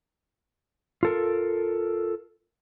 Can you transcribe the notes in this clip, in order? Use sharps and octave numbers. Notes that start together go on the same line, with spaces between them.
F4 A4 A#4